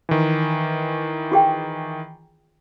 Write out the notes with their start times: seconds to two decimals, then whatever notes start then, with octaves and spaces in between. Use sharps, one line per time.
0.09 D#3 E3
1.32 F4 G#4 G5